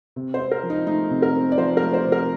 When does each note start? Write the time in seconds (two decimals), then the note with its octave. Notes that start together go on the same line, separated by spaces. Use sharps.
0.16 C3
0.34 C5
0.39 C4
0.51 A#4
0.63 F3
0.70 D#4
0.87 A3 D#4
1.11 C3
1.22 A#4
1.35 C4
1.52 D5
1.58 F3 C5
1.77 A#4
1.82 A3
1.94 C5
2.07 C3
2.12 A#4